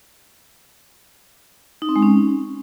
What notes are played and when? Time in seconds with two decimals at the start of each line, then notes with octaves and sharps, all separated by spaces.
1.82 D#4
1.89 C4
1.96 G#3
2.02 C#4